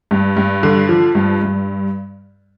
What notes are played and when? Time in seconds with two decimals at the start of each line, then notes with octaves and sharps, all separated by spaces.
0.11 G2
0.37 G2
0.63 D3
0.89 F3
1.15 G2
1.42 G2